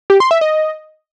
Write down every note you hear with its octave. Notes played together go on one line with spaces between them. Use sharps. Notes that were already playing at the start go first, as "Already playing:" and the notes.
G4
C6
E5
D#5